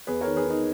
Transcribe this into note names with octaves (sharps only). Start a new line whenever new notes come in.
E2 G#4 B4
A#4 C#5
D#3
G#4 B4
D#3 D#4